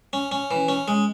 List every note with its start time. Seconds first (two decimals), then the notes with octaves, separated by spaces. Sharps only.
0.13 C#4
0.32 C#4
0.51 E3
0.68 C#4
0.88 G#3